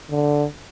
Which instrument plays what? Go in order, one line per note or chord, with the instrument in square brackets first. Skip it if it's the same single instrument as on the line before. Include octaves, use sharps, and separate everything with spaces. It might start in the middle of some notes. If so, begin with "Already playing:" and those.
[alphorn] D3